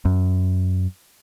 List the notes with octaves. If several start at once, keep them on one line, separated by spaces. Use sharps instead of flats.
F#2